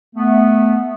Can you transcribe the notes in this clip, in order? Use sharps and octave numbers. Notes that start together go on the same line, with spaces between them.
A3 B3